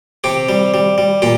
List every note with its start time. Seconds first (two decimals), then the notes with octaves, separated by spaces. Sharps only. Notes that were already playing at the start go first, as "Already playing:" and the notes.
0.24 C3 G4
0.49 G3
0.74 G3
0.98 G3
1.22 A#2 G4